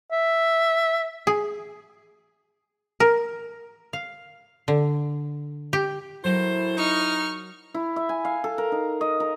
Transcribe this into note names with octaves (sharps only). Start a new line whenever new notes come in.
E5
G#4
A#4
F5
D3
G4
A2 F#3 E4 A#4 C5
D#4 C#6 F6
E4
E5
G#5
F5
A4
A#4
D#4
D#5
A#4